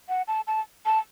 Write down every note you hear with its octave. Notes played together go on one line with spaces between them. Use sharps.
F#5
A5
A5
A5